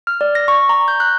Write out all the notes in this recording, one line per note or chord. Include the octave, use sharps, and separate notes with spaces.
F6
D5
A#6
C#6
A#5
G6
F#6